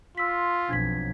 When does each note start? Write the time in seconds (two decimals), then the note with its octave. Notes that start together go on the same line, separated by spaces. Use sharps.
0.17 F4 C6 E6 B6
0.69 B1 F2 D4 G#6 B6